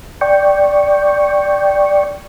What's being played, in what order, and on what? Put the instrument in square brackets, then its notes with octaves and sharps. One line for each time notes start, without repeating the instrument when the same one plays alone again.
[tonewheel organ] D5 G5 C#6